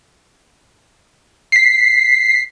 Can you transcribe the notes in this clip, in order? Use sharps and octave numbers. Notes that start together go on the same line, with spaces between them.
B6 C7